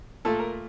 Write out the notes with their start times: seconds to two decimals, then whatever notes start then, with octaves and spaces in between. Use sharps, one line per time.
0.25 A#2 A3 A4
0.39 A#4